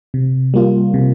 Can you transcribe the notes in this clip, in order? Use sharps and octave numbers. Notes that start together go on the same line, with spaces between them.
C3
G3 A#3 F4
C3